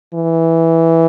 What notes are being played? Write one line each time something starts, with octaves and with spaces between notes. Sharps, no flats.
E3